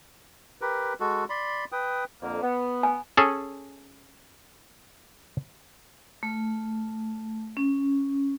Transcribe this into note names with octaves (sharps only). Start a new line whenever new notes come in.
G4 A#4 B4
G#3 F#4 A4
D5 B5 C6
B4 G5 D#6
F2 D3 A#3
B3
G#5
C#4 G#4 A4
A3
C#4